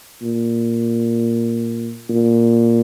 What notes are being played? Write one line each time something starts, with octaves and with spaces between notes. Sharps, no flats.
A#2
A#2